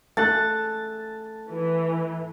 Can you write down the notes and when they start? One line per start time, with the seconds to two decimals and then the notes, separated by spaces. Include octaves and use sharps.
0.17 A3 A4 A5 F#6
1.50 E3